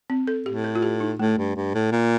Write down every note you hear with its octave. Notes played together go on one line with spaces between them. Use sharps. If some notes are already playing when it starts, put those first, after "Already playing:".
C4
A4
A2 G4
A4
F4
G4
D#4
A2 A3
G2
G2
A2
A#2